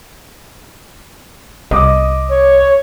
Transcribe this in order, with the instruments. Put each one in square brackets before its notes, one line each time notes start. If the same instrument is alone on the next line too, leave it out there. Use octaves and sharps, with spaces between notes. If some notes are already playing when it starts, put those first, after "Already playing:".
[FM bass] C2 [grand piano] D#5 D6 D#6
[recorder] C#5